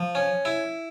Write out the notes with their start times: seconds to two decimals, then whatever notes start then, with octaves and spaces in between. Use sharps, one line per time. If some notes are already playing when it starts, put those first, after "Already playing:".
Already playing: F3
0.15 C#4
0.45 E4